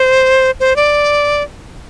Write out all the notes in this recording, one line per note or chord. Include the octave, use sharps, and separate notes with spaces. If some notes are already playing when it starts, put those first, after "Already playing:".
Already playing: C5
C5
D5